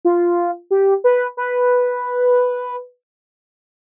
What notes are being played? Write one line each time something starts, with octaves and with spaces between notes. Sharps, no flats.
F4
G4
B4
B4